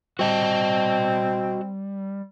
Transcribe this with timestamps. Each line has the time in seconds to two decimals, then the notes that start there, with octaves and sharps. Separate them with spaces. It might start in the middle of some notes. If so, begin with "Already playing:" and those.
0.19 G3 C4 F#4 D#5 A5